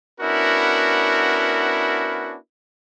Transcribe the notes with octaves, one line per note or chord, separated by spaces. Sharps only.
B3 C#4 D4 E4 F#4 A#4